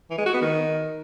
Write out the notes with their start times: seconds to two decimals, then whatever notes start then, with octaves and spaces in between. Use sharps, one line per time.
0.10 E3
0.18 G#3
0.26 F#4
0.34 B3
0.42 D#3